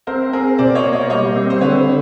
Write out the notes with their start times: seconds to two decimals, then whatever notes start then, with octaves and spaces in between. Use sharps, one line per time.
0.07 C4 A#4 C5
0.33 C4 G#4 A#4
0.58 B2 C5 D5
0.75 C#5 D#5
0.84 A#3
0.93 C#5 D#5
1.10 G3 C#5 D#5
1.35 C4
1.50 C5
1.61 D3 B4 C#5